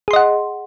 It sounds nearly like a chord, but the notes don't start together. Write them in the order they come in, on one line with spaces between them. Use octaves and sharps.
G#4 C6 D#5 F#5